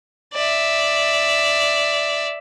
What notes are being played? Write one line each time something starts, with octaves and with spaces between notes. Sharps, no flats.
D5 E5